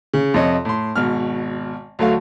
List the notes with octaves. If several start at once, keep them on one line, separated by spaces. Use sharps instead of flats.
C#3
F2 C3 C#5 D#5
A2 C6
G#1 B2 F6
D2 F#3 A3 F5